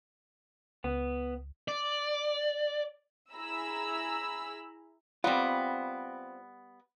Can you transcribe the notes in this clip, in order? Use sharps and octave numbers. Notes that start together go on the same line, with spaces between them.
C#2 B3
D5
E4 G#4 A#5 B5 E6
G3 B3 C4 F4